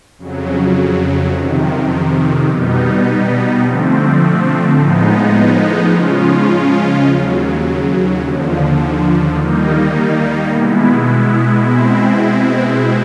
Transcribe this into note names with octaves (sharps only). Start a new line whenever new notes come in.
F2 C#3 F#3
F2 C3 D#3
B2 G3 B3 D#4
D3 F3 A3 C4
A2 F3 G#3 B3 D#4
C#3 F3 G#3 C#4 F4
D#2 C#3 F#3
D#2 D3 F3
D#3 G3 A#3 D#4
B2 G#3 B3 E4
B2 G#3 C4 E4